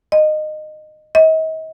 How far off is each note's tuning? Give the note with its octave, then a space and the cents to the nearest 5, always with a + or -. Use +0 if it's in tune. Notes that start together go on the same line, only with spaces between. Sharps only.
D#5 -20
D#5 +40